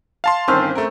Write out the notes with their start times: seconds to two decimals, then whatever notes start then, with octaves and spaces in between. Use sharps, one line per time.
0.24 F5 A5 C6
0.48 G1 D#3 C4 C#4 F6
0.75 A3 A#4